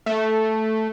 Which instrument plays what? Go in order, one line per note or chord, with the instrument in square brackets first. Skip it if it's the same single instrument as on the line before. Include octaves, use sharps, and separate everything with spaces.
[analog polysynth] A3